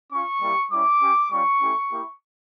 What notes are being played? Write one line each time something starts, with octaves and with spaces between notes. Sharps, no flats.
C#4 F4 C#6
G3 A#3 E4 G4
G3 C#4 E4 D6
C#4 G4
G3 C#4 F4 C#6
A3 C#4 E4 G4
A#3 E4 G4